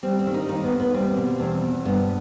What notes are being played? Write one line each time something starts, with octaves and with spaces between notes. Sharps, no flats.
G3 C4
C4
D#3
D#4
D#2 D#4
B3
D#2
B3
G3 C4
B2
E2 C4
E2
G2 B3